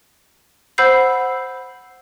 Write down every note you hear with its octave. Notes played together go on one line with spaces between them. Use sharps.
C5 F#5 B5 E6 G6 C7